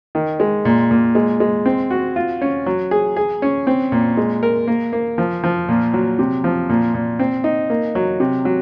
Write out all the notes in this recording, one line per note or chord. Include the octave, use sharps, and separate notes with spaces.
D#3
G#3
A#2
A#2
G#3
G#3
C4
F#4
F4
C#4
F#3
G#4
G#4
C#4
C4
A#2
G#3
A#4
A#3
A#3
F3
F3
A#2
F#3
C3
F3
A#2
A#2
C4
D#4
A#3
F#3
C3
F#3